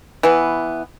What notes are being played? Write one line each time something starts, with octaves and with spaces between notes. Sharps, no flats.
E3 B3